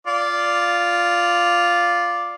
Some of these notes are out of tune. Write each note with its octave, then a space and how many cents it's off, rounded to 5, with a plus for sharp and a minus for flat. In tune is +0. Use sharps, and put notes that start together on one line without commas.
F4 +0 D5 +0